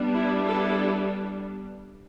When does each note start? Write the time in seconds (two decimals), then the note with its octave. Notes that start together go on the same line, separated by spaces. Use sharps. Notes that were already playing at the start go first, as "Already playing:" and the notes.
Already playing: G3 B3 D4
0.14 E4
0.44 E4 A4